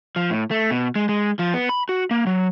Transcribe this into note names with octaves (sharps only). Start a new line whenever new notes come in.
F3
A2
A3
B2
G#3
G#3
F3
B3
B5
F#4
A#3
F#3